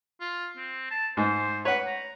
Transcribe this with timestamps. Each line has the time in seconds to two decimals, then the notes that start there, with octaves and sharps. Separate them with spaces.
0.20 F4
0.57 C4
0.91 A5
1.17 G#2 C5
1.65 B4 C#5 F#5
1.87 A#5